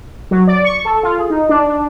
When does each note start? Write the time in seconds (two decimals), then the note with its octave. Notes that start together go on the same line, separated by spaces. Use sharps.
0.31 F#3
0.47 D5
0.65 C#6
0.85 A4
1.03 F4
1.18 G#4
1.30 D#4
1.49 D4
1.68 D4